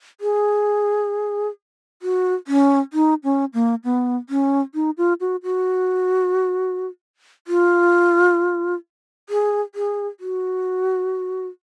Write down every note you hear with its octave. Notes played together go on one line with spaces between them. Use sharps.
G#4
F#4
C#4
D#4
C#4
A#3
B3
C#4
D#4
F4
F#4
F#4
F4
G#4
G#4
F#4